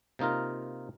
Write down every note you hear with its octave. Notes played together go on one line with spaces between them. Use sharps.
C3 A#3 D#4 F4 A#4